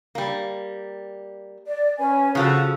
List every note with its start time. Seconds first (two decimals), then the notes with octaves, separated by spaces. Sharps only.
0.15 G3 A#3
1.67 D5
1.98 C#4 B4 G#5
2.35 C#3 F3 F#4 A4 F#6